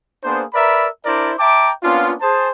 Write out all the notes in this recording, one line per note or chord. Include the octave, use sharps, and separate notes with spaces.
A#3 B3 D4 G#4 C5
A#4 B4 D5 E5 A#5 B5
D4 E4 A#4 C5 D5
E5 G5 A5 A#5 D6
A#3 B3 C#4 D4 F4
G#4 C5 A5